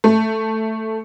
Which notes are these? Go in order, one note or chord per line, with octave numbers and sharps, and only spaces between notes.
A3